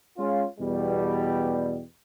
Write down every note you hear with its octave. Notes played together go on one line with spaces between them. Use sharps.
G#3 C#4 F4
E2 B2 G3